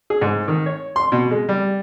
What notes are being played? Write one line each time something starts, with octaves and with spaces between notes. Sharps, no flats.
G#4
G#2
D#3
C#5
C6
B2
G#3
G3